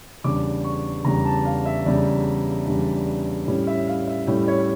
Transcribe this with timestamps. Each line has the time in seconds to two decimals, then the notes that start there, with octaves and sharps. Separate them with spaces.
0.24 E2 C#3 G3 D4 D6
0.64 C#6
1.05 E2 C#3 G3 D4 A#5
1.25 A5
1.45 F5
1.66 E5
1.86 E2 C#3 G3 D4 D5
2.66 E2 C#3 G3 D4
3.47 A2 G3 C#4 E4 D5
3.67 E5
3.87 F5
4.07 E5
4.27 A2 G3 C#4 E4
4.48 C#5